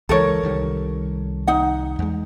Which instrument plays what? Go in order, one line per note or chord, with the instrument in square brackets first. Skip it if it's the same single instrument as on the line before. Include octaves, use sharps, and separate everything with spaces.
[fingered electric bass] C#2 E3 G#3 [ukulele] A4 A#4 C#5
[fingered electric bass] C2 D#3 G3
[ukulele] D#4 F#5
[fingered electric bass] E2 G#3